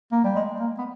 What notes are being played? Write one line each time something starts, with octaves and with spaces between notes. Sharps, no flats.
A#3
G3
G#3
A#3
B3